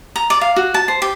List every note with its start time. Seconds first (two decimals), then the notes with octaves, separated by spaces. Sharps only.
0.16 A#5
0.30 D5
0.41 F5
0.56 F#4
0.74 A5
0.88 C5
1.02 G4